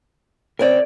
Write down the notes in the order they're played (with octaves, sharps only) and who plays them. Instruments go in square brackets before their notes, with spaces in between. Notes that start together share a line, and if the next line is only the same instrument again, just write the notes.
[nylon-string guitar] C#3 C4 C#5 [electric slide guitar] A#4 D5